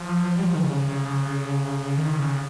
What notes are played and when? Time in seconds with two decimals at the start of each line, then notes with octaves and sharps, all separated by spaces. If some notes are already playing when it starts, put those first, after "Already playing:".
Already playing: F3
0.36 G3
0.45 F3
0.55 D#3
0.64 C#3
1.97 D#3
2.19 C#3